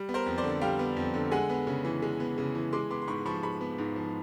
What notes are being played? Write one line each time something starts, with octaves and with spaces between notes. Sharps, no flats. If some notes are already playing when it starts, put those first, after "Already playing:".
Already playing: G3
B3
A#4 C5
F2
C5 D5
D3
G3 F5 G5
B3
F2
D3
G#3 F#5 G#5
B3
C#3
E3
G#3
B3
C#3
E3
G#3 C6 D6
B3 C6 D6
C6
G#2 B5 C#6
F3 B5 C#6
G#3 B5 C#6
B3
G#2
F3